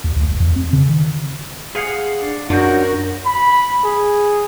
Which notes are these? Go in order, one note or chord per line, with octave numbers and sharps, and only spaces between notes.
D#2
D2
E1
E2
C4
C#3
D#3
G#4 C5 F5 F#5
D4
F#2 D4 F4 F#4 A#4 C#6 G6
B5
G#4